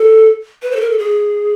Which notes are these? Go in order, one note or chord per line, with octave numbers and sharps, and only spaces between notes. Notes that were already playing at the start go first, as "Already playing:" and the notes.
Already playing: A4
B4
C5
A4
A#4
A4
G#4